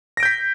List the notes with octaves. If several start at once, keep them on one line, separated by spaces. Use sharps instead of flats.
G6 A#6 B6 D7